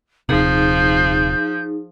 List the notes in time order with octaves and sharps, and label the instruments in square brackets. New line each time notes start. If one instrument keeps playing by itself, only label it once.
[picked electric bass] D#1 C3 [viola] F3 [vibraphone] D#4 G#4 [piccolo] G6